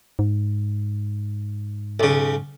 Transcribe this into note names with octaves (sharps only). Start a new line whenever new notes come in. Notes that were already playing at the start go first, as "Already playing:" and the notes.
G#2
B1 C#3